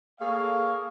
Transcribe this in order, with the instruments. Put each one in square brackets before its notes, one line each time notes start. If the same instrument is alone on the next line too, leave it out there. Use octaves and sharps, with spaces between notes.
[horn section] A#3 G#4 A4 C#5 F5